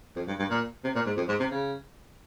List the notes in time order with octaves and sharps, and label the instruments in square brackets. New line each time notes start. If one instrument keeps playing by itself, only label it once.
[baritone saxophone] F2
G2
G2
A#2
C3
A#2
G#2
F2
G#2
C3
C#3